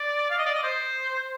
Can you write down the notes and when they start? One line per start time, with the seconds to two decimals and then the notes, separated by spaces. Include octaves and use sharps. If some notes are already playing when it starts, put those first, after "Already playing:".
Already playing: D5
0.30 F5
0.38 D#5
0.46 D5
0.54 D#5
0.63 C5